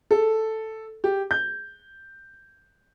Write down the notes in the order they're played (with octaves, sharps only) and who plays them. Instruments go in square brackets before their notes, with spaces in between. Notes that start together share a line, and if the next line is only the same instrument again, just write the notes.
[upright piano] A4
G4
G6